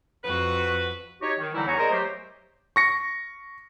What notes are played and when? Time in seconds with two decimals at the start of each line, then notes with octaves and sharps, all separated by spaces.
0.24 F2 F#4 B4
1.22 D#4 F#4 G4 C#5
1.39 D#3
1.53 D3 E3 F#3 G3 D#4 E4
1.67 E2 C#5 F#5 G#5 A#5 C#6
1.78 G#4 A#4 C5 D5 D#5 A#5
1.91 F#3 A3 G4 C5
2.76 C#6 A#6 C#7